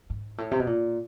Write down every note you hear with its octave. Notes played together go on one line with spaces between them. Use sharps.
G#2
A2
C3
B2
A#2